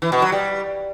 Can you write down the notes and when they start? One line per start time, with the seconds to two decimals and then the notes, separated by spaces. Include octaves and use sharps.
0.02 E3
0.12 B2
0.22 F#3
0.32 G3